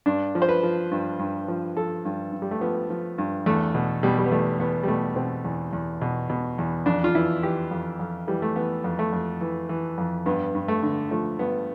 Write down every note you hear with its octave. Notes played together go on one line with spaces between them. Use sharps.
G2 D4
F3
C5
B4
F3
G2
G2
F3
F3 A4
G2
G2
G3
A3
F3 B3
F3
G2
E2 A3
B2
B2 G3
G3
B3
E2 A3
E2 B3
G3
B2 A3
B2 C4
E2
E2
B2
B2
E2
F2 D4
F4
E3 E4
E3 G4
F2
F2
E3 G3
A3
E3 B3
F2
A3
F2
E3
E3
F2
G2 B3
G2
A3
D3
F3 A3
G2 B3